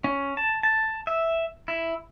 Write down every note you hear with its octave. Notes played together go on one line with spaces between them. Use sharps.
C#4
A5
A5
E5
E4